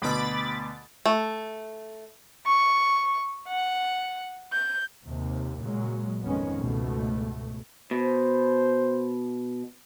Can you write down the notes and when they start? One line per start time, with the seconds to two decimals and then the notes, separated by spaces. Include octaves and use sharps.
0.02 D2 B2 B5 D6 A6
1.06 A3
2.47 C#6
3.48 F#5
4.53 G6
5.05 D#2 C3
5.61 A#2 C#3 F#3 G#3
6.23 G#1 F2 D#3 G#3 B3 C#4
6.60 C#2 G#2 B2 A3
7.91 B2 C5